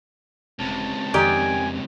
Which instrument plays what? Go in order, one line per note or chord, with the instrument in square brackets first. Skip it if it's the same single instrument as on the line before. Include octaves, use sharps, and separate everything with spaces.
[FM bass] E1 [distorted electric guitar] C#2 C3 [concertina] A5
[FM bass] F2 [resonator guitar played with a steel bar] D#3 G4 D5 [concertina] G#5